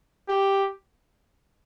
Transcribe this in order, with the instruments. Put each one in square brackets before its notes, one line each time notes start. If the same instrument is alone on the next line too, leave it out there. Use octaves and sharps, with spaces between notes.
[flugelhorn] G4